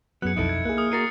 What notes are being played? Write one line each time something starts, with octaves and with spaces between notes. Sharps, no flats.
F#2 F#3 B3 G#4 F#6 C#7
B1 F2 D#4 E4 A4
G#6
A#3 G#4 F#6
D#6 F6
F#4 A#4 G#5 A6 C7 C#7